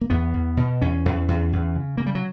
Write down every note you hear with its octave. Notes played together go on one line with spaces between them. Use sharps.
A#3
E2 B3
E2
B2
E2 C#4
E2
E2
E2
C#3
C#3 A#3
G3
F#3